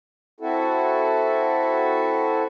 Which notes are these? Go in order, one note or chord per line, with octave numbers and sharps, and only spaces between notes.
C4 E4 F#4 A4